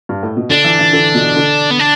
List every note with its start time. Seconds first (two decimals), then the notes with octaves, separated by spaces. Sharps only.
0.09 G2
0.23 A2
0.37 B2
0.50 D3 D4
0.64 E3
0.79 E3
0.93 D3
1.15 B2
1.36 D3
1.71 B3
1.80 D4